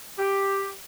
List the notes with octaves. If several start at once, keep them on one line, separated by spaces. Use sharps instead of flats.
G4